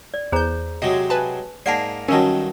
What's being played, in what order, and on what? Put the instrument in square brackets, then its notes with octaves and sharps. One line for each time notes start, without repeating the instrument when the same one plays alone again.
[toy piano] D5
[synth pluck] E2 G6 [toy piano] G#4 C5 A#5
[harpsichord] C3 F#3 G#3 [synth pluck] D#5
[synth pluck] B4 G#5 A5
[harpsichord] G#2 A#3 A#4 [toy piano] D5 F#5 A5 [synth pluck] C7
[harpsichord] G2 D#3 F#3 [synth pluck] C#4 D#5 [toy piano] A#4 A5